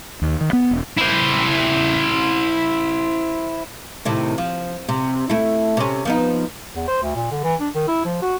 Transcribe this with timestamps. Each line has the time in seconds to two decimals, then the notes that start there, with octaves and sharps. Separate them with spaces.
0.22 D#2
0.41 D#3
0.53 B3
0.71 E1
0.97 E4 C5
4.05 A2 C3 D#3
4.38 F3
4.89 C3
5.30 A3 E4
5.77 C3 C#4
6.05 F3 B3 D#4
6.76 E2
6.88 C5
7.03 D2
7.16 A#2
7.31 D3
7.44 E3
7.60 D4
7.75 D#3
7.88 E4
8.05 F3
8.22 F#4